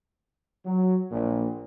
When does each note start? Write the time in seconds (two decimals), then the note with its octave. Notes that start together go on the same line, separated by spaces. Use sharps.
0.65 F#3
1.11 A#1 A#2